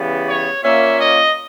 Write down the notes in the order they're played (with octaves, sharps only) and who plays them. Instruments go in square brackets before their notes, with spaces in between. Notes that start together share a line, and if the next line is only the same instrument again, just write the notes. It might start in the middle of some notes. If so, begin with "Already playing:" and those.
Already playing: [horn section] C#3 E3 G3 B3
C#5
A#2 A#3 C#4 E5
D#5